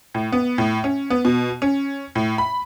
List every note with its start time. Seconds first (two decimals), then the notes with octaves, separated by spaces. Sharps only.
0.15 A2
0.32 B3
0.58 A2
0.84 C#4
1.10 B3
1.25 B2
1.62 C#4
2.15 A2
2.38 B5